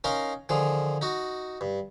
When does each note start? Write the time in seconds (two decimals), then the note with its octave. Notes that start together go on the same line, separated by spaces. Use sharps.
0.04 C#4 D#4 A#4 F5 C6
0.49 D3 D#3 F3 G#4
1.01 D#4 F#4
1.61 G2